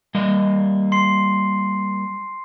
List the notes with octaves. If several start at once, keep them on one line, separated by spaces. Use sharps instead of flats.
G3 A#3 D#5
C6 C7